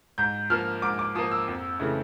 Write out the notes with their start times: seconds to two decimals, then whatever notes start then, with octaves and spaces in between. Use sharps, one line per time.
0.18 G#2 G6
0.50 F3 A#3 F6
0.82 G#2 D6
0.99 D6
1.15 F3 D#6
1.18 A#3
1.31 E6
1.48 F2
1.80 C#3 E3 A3